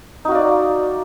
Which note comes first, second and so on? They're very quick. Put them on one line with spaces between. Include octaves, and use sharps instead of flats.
D#4 F#4 F5 D5